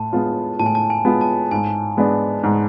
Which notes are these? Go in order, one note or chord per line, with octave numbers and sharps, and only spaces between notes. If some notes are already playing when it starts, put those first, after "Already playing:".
Already playing: A2 A5
G#3 B3 F4
A2 A5
G#5
A5
G#5
G#3 B3 F4
A5
G#2 G#5
G#3 B3 D4
G#2